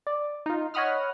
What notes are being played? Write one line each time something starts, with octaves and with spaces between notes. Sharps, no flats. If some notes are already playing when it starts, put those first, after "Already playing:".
D5
D#4 F4
C#5 D#5 F#5 B5 D#6 F6